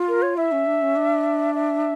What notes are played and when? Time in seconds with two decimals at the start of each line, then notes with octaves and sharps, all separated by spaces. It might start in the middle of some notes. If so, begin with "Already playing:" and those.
Already playing: F4
0.08 A#4
0.22 C#5
0.37 E4 E5
0.52 C#4
0.66 D4
0.82 C#4
0.96 D4
1.55 E5